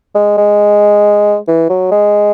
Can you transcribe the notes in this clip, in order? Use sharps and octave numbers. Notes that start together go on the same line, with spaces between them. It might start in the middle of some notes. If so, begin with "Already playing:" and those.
G#3
G#3
E3
F#3
G#3